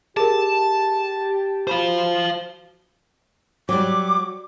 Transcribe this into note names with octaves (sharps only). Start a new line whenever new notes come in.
G4 G#4 A#4 A5
F#4 C5 F5 B5
F#3 G3 D6